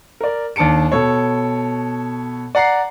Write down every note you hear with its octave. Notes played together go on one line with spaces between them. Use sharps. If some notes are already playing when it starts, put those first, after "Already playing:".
A#4 D5
D#2 D4 A5 C#7 D7
B2 A4 C#5
D5 F#5 A#5 C7